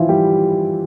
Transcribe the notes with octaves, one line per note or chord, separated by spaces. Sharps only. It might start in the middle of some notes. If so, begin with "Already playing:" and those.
Already playing: E3 F3 E4 F4
G3 G4